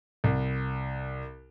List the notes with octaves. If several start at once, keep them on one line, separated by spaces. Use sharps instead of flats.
C2